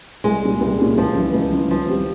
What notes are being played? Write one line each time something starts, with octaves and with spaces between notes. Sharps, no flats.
C2 G#3
A#2 G3 C#4
C2
A#2 G3 C#4
C#2 F3
C#3 E3
C#2
C#3 E3
E3 F3
G3 C4 G4